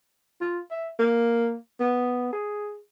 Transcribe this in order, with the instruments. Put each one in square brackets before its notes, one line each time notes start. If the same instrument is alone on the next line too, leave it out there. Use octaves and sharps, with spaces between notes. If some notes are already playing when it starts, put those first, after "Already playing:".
[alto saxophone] F4
E5
A#3
B3
G#4